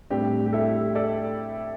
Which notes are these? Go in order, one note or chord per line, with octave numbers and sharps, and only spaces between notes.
A2 G3 C4 D4 G4
G4
E4 A4
A4 D5